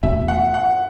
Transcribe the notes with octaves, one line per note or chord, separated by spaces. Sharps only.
E1 E2 B2 A3 E5
F#5
F#5